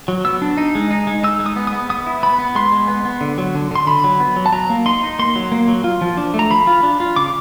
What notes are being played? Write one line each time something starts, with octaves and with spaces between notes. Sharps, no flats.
F#3
B3 E6
D4
D#4
G#3
D#4
G#3
D#4 E6
G#3
D#6
B3
D#6
B3
B3 D#6
E4
B3 B5
B3
G#3 C6
G#3
B3
B3
D3
F#3
D3
D3 C6
D3 B5
F#3
B3
F#3
A5
F#3 A#5
A#3
D#4 C6
D#4
A#3 C6
F#3
A#3
F#3
F4
F3
D4
A3
A#5
F3 B5
F4
D4
F4
C#3 D6